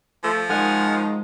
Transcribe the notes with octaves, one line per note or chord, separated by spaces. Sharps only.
F3 A3
D#3 G#3 F#5 G#5 F6